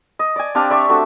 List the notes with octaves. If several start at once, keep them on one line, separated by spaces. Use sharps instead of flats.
D#5
D5 G#5
C4 D4 G4 F5
D5 E5 C#6
A3 C4 D4 F#4